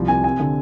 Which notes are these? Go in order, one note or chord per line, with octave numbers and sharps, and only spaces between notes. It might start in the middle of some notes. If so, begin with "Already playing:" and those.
Already playing: C2 F3
C3 G#5
C4 G#5
D3